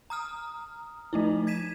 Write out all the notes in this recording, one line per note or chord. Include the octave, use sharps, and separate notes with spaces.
A#5 D#6 F6
F3 A3 D#4 E4
G#6 B6 D#7 E7